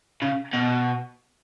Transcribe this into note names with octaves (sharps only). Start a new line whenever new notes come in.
C#3
B2